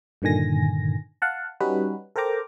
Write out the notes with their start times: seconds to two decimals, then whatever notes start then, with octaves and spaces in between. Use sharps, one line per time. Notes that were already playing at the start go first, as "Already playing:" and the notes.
0.22 G2 A#2 D3 D#3 G#5 A#6
1.22 F5 F#5 A5
1.60 G3 C#4 D#4 F#4 B4
2.16 A4 A#4 C5 G5 A#5 D6